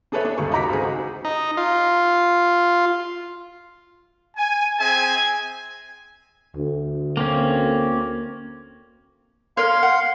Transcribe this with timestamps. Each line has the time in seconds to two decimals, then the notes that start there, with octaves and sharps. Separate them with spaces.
0.12 D4 G#4 A4 B4 C#5 E5
0.25 D4
0.38 D#1 C#2 A3 G#4 A4 C#6
0.52 D#4 F#4 A#5 D6 B6
0.69 C#2 C4 G#4
0.82 D#4 F#4
1.25 D#4
1.57 F4
4.37 G#5
4.79 C4 G#4 E5 G#5
6.55 D2
7.17 A#3 C4 C#4
9.57 A#4 C#5 F5 C6
9.83 F#5